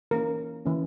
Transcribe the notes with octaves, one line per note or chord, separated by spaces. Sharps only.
E3 A#3 C#4 A#4
E3 A#3 C#4